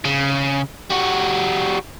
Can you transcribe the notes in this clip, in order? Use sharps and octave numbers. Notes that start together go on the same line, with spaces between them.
C#3
G3 F#4